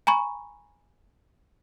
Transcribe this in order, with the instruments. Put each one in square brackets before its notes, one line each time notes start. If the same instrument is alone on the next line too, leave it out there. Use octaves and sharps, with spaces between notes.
[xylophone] G#5 A#5 B5 C#6